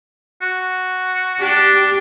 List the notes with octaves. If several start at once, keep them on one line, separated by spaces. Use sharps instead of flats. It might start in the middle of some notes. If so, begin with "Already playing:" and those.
F#4
D4 G4